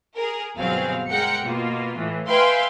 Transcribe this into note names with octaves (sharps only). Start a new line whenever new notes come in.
G#4 A#4
G1 B2 F#3 C4 G#4 F5
G#3 A#4 F#5 G5 C#7
B2 A#3 F4
A2 E3
B4 E5 F5 G5 G#5 C6